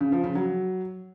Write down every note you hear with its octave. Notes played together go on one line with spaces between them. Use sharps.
C#3
F3
C#3
F#3